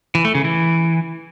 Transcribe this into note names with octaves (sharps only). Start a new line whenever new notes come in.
E3
A3
C#3
E3